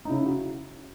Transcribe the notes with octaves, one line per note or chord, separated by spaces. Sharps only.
D#4
C#3 E4
F#4